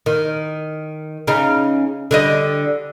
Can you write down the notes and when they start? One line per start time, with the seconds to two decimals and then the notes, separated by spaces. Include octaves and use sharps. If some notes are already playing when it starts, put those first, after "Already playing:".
0.06 D#3
1.27 C#3 C#4 D#4
2.11 D3 G3 D#5